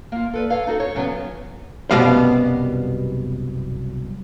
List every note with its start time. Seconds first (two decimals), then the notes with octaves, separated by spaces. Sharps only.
0.12 A#3 F4
0.33 A4 B4 D5
0.50 A4 C#5 F5
0.67 D#4 F#4 A4
0.80 C#5
0.95 F#2 C#3 F#3 G3 B3
1.91 C2 F#2 B2 G3 B3 F5